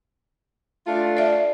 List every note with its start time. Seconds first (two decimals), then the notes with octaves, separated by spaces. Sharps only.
0.86 A3 D4 F4
1.17 D5 E5